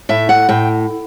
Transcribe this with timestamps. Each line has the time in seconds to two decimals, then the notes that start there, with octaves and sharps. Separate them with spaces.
0.09 A2 E5
0.29 F#5
0.49 A2 G5